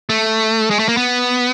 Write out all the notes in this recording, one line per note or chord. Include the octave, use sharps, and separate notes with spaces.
A3
G#3
A3
A#3
B3